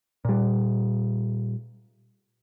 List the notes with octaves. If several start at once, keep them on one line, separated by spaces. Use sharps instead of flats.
A#2 G3